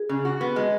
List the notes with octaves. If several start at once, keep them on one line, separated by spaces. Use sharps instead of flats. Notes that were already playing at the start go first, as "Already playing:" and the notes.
Already playing: G#4
C#3
F#4
B3
G#3